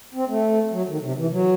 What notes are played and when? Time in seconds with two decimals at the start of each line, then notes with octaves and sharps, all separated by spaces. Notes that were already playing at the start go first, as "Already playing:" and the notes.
0.14 C4
0.28 A3
0.72 F#3
0.88 D#3
1.02 C3
1.16 E3
1.32 F#3